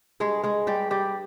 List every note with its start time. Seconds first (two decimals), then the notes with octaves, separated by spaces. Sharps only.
0.20 G2 G#3 G#4
0.43 G#3 G#4
0.67 G2 G3 G4
0.91 G3 G4